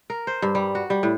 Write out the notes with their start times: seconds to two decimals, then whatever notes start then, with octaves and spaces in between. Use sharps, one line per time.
0.10 A#4
0.27 C5
0.42 G2
0.55 G3
0.75 F#4
0.90 G3
1.03 A2